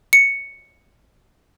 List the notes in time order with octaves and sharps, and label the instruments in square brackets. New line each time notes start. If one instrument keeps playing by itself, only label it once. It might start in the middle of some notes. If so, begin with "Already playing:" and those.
[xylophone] C#7